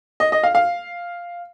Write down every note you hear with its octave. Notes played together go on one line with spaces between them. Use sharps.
D#5
D#5
F5
F5